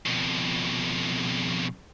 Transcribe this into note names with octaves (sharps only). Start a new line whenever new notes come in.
F2 B2